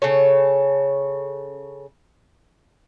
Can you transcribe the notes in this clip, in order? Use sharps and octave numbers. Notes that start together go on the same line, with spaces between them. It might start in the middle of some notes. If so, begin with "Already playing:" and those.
C#3 A4 C#5